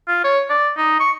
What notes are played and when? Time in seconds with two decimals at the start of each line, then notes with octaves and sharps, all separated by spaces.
0.08 F4
0.24 C#5
0.50 D5
0.77 D#4
1.00 C#6